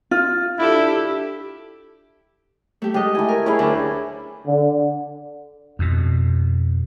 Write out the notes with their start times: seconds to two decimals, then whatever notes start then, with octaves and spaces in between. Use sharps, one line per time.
0.11 F4
0.59 D4 E4 G4 A4
2.82 A3 G4
2.94 G#3 G4 A4 D#5
3.15 A3 E4 G#5
3.28 A#4
3.46 C#4 E4 G#4 C#5
3.59 D2 D4
4.46 D3
5.79 F2 B2